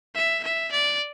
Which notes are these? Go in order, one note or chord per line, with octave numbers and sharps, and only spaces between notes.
E5
E5
D5